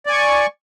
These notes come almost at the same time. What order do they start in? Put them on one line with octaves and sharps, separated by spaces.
D5 G#5 C#6